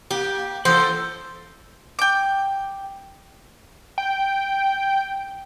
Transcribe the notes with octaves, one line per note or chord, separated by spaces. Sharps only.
A#3 G4
E3 A#3 A4 C5
G5 D6
G5